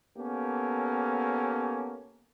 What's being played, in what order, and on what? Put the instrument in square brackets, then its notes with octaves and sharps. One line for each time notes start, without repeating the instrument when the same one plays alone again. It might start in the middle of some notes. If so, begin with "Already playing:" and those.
[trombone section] A#3 B3 C#4 G4 A4